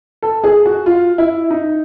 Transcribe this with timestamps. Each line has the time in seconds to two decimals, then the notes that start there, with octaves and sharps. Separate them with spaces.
0.22 A4
0.44 G#4
0.66 F#4
0.86 F4
1.18 E4
1.50 D#4